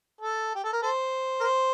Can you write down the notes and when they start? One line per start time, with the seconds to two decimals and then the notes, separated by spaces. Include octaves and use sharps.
0.21 A4
0.55 G4
0.64 A4
0.73 A#4
0.82 A4 C5
1.40 A#4
1.44 C5